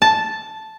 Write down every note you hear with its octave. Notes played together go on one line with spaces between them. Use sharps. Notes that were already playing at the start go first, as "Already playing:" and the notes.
A5